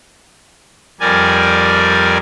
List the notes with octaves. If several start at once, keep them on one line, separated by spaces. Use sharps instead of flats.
F2 G3 A#4 D5 G#5